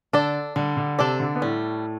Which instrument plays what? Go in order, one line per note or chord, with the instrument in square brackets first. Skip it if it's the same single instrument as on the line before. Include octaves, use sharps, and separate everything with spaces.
[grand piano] D3 [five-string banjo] D4 A4 D5
[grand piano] D3 [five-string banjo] G3
[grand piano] D3
[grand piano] C3 [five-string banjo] D4 A4 D5
[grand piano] D3
B3
[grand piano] A2 A3 [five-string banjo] G3